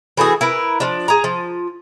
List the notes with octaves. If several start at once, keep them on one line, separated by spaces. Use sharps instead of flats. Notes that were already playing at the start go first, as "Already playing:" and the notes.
E3 A3 F#4 G#4
E4 A#4 B4
F3 D4
G#4 A#5
F3